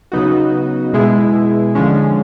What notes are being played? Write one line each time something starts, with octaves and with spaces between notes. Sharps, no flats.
C#3 F#3 B3 D#4 F#4
B2 G#3 B3 E4
D3 F3 G#3 C#4